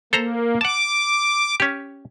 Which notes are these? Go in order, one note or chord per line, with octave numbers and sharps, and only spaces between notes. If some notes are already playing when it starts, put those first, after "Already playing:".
A#3 A4 C5 A#5
F#5 A5 D6
C#4 G4